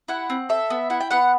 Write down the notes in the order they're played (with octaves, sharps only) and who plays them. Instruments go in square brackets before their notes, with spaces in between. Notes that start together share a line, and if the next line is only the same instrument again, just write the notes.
[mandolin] E4 F#5
C4
A4 E5
B3
E4 F#5
G5
B3 F#5